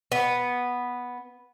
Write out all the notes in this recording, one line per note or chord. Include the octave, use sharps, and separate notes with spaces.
B3